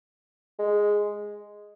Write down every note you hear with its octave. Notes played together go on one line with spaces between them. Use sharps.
G#3